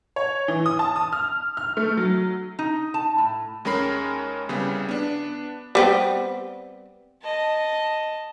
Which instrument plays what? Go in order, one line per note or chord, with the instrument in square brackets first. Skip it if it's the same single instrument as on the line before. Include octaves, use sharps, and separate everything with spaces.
[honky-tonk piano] C#5
E3
D#6
A5
D#6
F6
F6
A3
F#3
[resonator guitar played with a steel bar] D#4
A5
A2
[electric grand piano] D#2 G#3 C#4 A#4 B5 C7
C2 C#3 G3 B3
B3 D4
[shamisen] G3 B3 C4
[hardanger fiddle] D#5 A5